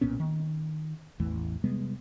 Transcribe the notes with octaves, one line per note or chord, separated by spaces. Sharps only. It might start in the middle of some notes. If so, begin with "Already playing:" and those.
B1 A#2 B3 C#4
D#3
A1 E2 E3 A3
C3 G3 G#3 B3